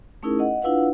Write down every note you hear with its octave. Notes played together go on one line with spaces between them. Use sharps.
A3 C#4 D#4 E4 G#4 A#4
D#5 F#5
D4 E4 F4 B4 F5 F#5